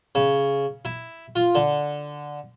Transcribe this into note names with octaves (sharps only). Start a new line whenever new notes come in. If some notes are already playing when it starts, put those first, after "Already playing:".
C#3
E4
F4
D3